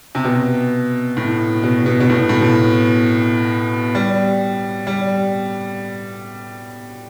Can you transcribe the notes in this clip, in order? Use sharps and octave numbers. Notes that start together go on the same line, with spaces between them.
C3
B2
A2
B2
B2
B2
A2
A2
B2
G3
G3